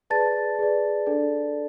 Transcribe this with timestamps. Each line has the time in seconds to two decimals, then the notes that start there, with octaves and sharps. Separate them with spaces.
0.10 G#4 B4 D5 A5 A6
0.59 G#4 B4 D5
1.06 D4 A4 D5